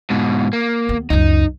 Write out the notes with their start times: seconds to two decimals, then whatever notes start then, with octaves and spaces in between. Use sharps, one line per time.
0.10 G#2 B2
0.53 A#3
0.89 D#2 B3
1.10 C#2 F#2 D#4